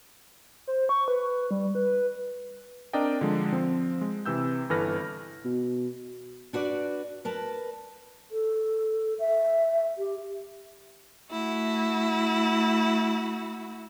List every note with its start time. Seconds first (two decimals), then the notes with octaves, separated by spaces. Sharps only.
0.67 C5
0.89 C#6
1.08 B4
1.51 G3
1.75 B4
2.93 C4 D4 A#4 D5 D#5 G5
3.21 D3 F3 G#3
3.52 F3 C4
4.01 G#3
4.26 C3 E3 E6 G6
4.70 G1 E3 A4 B4 F6 A#6
5.45 B2
6.53 D4 F#4 B4 D5
7.25 A#4 B4 A5
8.31 A4
9.19 E5
9.98 G4
11.30 A3 E4 F#4